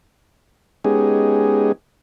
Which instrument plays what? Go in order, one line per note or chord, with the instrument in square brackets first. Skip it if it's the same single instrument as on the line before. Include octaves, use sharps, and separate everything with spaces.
[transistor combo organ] G#3 B3 C#4 D#4 G4 G#4